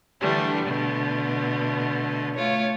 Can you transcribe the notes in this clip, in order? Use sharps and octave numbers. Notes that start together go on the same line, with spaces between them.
D3 E3 G3 A3 D4
B2 D3 A3
A3 F4 C#5